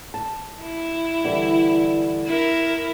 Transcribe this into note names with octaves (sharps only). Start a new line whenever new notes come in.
A5
E4
D3 E3 G3
E4 A#4